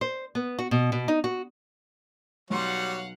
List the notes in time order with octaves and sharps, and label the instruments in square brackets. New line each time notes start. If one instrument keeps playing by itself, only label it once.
[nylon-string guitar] C5
B3
F#4
B2
B2
D#4
F#4
[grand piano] B1 C6 [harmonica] G3 F#4 C#5 [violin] F5 F#5